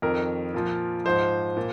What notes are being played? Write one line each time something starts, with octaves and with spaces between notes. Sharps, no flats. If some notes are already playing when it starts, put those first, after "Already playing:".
F2 D#3 A#4
A#2 F3
G#2 F3 C5
A#2